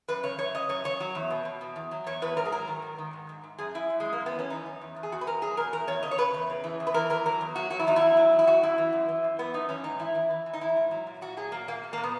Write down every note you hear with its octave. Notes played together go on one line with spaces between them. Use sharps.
F#2 B4
C#3 C#5
F#2 C#5
C#3 D#5
F#2 C#5
C#3 C#5
F#3
E2
B2
B2
B2
E2
F#3
E2 C#5
E2 B4
G#2 A#4
G#4
F#3 A#4
D#3
G#2
D#3
G#2
G#2
G#2
F#2 G#4
F#2 E4
F#2
F#2 G#3
A#3
F#2
B3
E3 C#4
E3 D#4
F#2
E2
E2
G#4
E2 F#4
B4
E2 A#4
F#3 G#4
B2 A#4
E2 A#4
E2 C#5
C#3 D#5
C#5
C#3 B4
E2
C#3
E3
E2
B4
E3 A#4
E3 A#4
F#3 A#4
E2
F#3 F#4
F#3 F#4
E4
E2 D#4
E4
E2
F#3
E2
E4
F#2 F#4
F#2 E4
E3
F#2
E3
F#2
E3 B3
F#2 D#4
E3 C#4
G#2 D#4
E3 E4
E3
E3
E3
D#4
E3 E4
G#2
F#3
A#2
A#2 F#4
F#3 G#4
A#2 A#3
A#2 A#3
A#2
A#3
A#2
B3